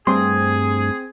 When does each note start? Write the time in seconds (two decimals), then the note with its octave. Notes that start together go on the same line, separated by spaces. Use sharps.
0.07 G2 A3 C4 G#4 C6